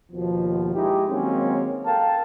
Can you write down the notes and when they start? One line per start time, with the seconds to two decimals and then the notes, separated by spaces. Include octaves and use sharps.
0.12 D#2 B2 F3
0.75 G#3 D#4 E4 G4
1.10 D#3 F#3 G#3 A#3 C4 C#4
1.86 A4 A#4 F5 G5 A5